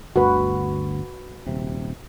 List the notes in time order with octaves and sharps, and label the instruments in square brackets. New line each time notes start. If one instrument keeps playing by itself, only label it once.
[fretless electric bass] G1 D2 [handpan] F#4 B4
[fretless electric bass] D#1 C3